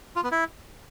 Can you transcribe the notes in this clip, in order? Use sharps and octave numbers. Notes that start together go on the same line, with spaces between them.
F4
B3
E4